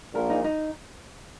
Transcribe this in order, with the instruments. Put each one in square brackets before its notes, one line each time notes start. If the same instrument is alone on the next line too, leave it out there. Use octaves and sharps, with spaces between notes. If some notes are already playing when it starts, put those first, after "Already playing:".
[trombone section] A#1 A#2 [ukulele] A#4
[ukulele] D#4
D#4